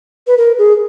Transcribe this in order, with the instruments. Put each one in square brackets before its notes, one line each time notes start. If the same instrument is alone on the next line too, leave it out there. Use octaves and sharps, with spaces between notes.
[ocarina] B4
A#4
G#4